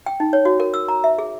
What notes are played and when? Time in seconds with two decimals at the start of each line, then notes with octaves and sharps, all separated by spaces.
0.06 G5
0.20 D#4
0.33 C#5
0.45 F#4
0.60 A#4
0.74 E6
0.88 A#5
1.04 E5
1.19 G#4